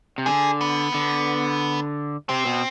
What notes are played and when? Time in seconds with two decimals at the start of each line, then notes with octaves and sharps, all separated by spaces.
0.18 C3
0.26 D3 G#4
0.61 B3
0.94 D3
2.29 C3 C4
2.46 B2